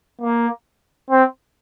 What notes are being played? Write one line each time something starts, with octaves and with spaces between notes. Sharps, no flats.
A#3
C4